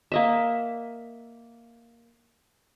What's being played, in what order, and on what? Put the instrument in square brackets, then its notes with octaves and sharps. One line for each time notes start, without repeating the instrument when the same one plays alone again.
[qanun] A#3 D#5 E5